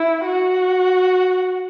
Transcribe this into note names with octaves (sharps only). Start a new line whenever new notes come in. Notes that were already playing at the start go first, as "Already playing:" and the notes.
Already playing: E4
F#4